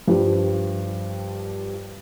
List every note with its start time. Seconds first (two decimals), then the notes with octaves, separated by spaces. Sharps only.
0.08 G2 F3 G3